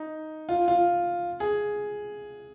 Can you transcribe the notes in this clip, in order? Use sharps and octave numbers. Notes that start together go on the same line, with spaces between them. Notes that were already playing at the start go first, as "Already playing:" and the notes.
Already playing: D#4
F4
F4
G#4